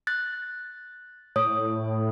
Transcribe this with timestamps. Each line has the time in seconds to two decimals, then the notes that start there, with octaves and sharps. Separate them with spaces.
0.07 F#6 A6
1.36 A2 C#5 D#6